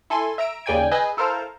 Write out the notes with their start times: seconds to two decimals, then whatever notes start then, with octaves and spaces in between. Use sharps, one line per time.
0.10 E4 A4 G#5 C6
0.38 E5 A#5 E6 D7
0.66 D#2 C#3 D5 G5 G#5 G#6
0.91 G#4 B4 D#5 G#5 E6 G6
1.17 E4 A4 A#4 C5 F5 A#5